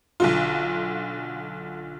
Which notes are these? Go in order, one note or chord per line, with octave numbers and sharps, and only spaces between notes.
B1 D3 F4